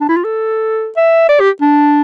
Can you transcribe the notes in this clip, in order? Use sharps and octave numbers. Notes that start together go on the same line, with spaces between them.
D4
E4
F4
A4
E5
D5
G4
D4